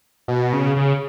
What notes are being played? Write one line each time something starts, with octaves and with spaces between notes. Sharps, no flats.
B2
C#3
C#3